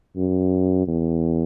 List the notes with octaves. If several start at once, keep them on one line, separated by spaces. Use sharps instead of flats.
F#2
E2